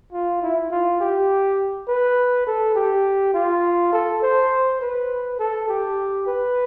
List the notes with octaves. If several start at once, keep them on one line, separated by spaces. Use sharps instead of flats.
F4
E4
F4
G4
B4
A4
G4
F4
A4
C5
B4
A4
G4
B4